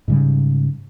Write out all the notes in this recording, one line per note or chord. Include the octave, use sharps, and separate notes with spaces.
G#2 C#3 G3